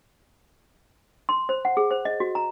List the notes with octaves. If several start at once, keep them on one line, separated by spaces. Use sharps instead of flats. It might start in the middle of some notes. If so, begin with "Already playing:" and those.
C6
C5
F#5
G#4
C5
D#5
F#4
A#5